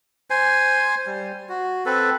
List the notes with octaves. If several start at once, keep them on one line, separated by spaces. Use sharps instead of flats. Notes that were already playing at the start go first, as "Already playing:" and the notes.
C5 G#5
G3
F#4
C4 A4 B4